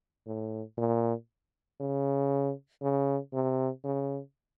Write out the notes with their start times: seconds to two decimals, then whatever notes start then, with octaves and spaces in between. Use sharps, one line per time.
0.26 A2
0.78 A#2
1.80 C#3
2.82 C#3
3.33 C3
3.84 C#3